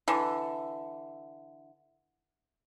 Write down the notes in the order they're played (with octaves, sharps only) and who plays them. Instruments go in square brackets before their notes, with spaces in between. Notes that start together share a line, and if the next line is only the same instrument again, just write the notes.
[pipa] D3 E3